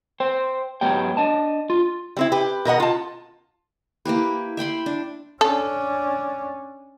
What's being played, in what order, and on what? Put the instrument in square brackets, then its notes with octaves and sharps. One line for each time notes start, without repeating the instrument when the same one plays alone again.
[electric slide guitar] C5 G5
G#2 F#3 B3 G4 G5
D4 D#5 A5
F4
[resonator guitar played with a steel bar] G3 C4 E4
G4 B4
B2 A#4 D#5 F#5
F4 A5
[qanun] A#3 E4 G4 B4
E5 G5 B5 C6
D4
[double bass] C#4 D4 [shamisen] A4